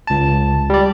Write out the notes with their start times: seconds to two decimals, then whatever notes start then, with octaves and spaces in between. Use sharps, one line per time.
0.07 C#2 A5
0.70 G3 D5